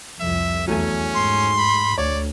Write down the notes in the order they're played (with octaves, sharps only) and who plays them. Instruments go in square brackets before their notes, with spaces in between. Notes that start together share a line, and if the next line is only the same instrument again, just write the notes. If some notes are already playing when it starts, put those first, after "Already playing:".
[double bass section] C2 F2 [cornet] E5
[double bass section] E2 [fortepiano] F#3 A3 G#5 [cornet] C#4
[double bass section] G#2 [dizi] C6
[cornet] B5
[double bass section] D2 [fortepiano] C#5 [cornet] D5